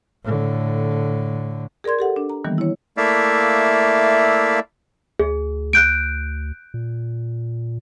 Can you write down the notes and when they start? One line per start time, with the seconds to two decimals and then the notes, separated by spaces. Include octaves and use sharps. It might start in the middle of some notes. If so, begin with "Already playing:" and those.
0.24 A2 D3
1.84 G#4 A#4 D5 C6 G#6
1.99 G4 A4 F#5
2.16 D4
2.30 A#5
2.44 D#3 E3 G3 A#3 B3
2.58 E4 C#5
2.97 A3 A#3 E4 D5 E5 F5
5.19 D2 G#4
5.73 F#6 G6 D7
6.74 A#2